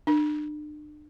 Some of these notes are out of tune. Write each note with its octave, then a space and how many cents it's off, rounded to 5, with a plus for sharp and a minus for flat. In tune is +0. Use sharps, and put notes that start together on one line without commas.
D4 +40